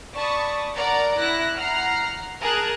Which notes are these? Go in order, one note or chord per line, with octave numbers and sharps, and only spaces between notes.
D5 A5 B5 C#6 D#6
A#4 D5 F#5 A#5
E4 F#6 A#6
F#5 A#5 F6 C7
G#4 A#4 A5 F#6